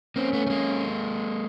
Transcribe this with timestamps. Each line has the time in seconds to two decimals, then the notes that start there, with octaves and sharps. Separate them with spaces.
0.16 A#3 C4 C#4
0.33 A3 B3
0.47 A3
0.50 G#3 A#3